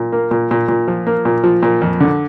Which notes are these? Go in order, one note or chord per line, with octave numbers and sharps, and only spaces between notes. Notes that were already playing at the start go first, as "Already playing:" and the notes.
Already playing: A#2
A#3
A#2
A#2
A#2
F3
A#3
A#2
F3
A#2
F2
D3